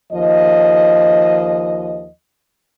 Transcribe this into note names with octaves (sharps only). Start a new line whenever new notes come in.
D#2 F3 D#5